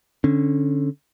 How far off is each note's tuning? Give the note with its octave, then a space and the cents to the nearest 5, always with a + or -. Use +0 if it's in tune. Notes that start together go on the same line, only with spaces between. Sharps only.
D3 -5 C#4 -20